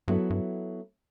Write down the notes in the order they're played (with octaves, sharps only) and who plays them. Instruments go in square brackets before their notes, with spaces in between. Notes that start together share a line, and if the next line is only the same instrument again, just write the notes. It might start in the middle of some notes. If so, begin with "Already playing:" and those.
[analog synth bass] G2 [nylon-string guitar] F#3 B3 E4 A4
[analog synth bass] G2